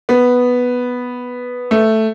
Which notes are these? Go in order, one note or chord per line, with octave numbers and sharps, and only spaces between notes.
B3
A3